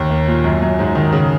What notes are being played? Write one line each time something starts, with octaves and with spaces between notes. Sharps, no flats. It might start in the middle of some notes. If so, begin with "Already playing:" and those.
Already playing: D#2
A#3
A#2
F#2
F#2
G#2
D#3
C#3